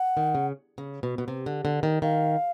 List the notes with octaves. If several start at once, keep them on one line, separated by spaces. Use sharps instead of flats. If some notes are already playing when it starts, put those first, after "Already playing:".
Already playing: F#5
D#3
C#3
C#3
B2
B2
C3
D3
D3
D#3
D#3 F5